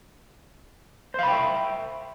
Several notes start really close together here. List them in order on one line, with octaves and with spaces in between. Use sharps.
C5 F5 B5 G5 E5